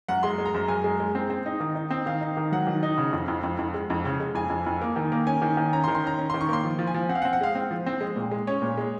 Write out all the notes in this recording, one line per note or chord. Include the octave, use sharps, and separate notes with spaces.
F#2 F#5
G#3 C6
G#3
A#5
F#2
F#2 G#5
G#3
G#3
C4
C4
D#4
D#3
D#4
C4
D#3 F5
D#4
D#3
F#3 F#5
D#3
D#4
C#3
F2
F2
F2
F2
G#3
F2
C#3
G#3
F2 G#5
F2
F2
A#3
D#3
A#3
C#4 G#5
D#3
D#3
C#4 A#5
C6
D#3
C6
C#4 A#5
C#4
D#3 C6
C#6
A#3 C6
F3
F3
G#5
F3
C4 F#5
F5
F#5
C4
F#5
G#3 F5
C4
F3
C4
G#3
A#2
G#3
C#4 C#5
A#2
G#3